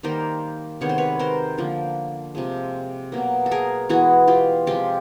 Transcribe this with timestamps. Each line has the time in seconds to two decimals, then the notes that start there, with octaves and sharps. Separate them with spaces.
0.03 D#3 G3 A#3 A#4 C5
0.81 C3 D#3 G#3 B3 C#5
0.89 C5
0.98 B4 C#5
1.19 A#4 C5
1.58 D3 F3 A#3
2.35 C3 F3 G#3
3.12 B2 F#3 A#3
3.46 A4
3.51 G#4 A#4
3.89 E3 G#3 B3 F#4 G#4
4.27 F4 G4
4.67 C3 F3 G#3 F4 G4